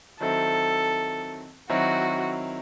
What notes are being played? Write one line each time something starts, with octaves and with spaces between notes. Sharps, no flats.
D#3 F#3 C4 E4 A4
D#3 F#3 C4 E4 F#4